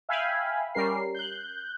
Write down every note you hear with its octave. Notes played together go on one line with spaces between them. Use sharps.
E5 F5 G5 G#5 B5
G3 C#4 A#4 C7
F#6 G6